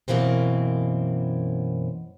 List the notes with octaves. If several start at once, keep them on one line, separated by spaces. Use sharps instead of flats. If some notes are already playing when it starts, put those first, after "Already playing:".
F#2 B2 E3 A#3 C4